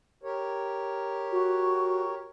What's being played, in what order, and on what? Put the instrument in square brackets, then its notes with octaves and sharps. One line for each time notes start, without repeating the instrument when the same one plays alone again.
[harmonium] G4 A#4 C#5
[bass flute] F#4